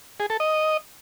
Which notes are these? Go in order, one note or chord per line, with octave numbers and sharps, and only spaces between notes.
G#4
A4
D#5